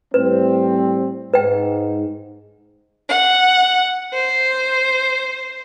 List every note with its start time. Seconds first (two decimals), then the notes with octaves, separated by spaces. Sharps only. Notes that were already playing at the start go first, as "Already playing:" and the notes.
0.14 A2 G3 C4 B4
1.34 G#2 B4 G5
3.09 F#5
4.13 C5